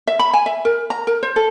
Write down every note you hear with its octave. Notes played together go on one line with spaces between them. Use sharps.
E5
B5
G#5
E5
A#4
A#5
A#4
C5
A4